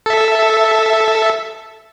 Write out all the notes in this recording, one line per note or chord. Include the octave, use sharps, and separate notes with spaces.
A4 E5